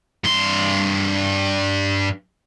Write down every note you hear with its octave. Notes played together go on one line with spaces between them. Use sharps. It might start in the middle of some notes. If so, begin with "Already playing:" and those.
G2 C6